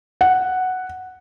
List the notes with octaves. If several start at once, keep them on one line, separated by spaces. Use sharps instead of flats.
F#5